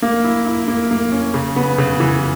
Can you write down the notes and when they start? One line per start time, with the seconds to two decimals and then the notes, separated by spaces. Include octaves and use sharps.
0.02 A#3
0.24 E4
0.46 E4
0.68 A#3
0.91 A#3
1.12 C#4
1.34 C#3
1.56 B3
1.78 C#3
2.00 E3